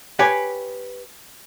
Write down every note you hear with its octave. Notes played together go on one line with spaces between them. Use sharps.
G4 B4 C#5 G#5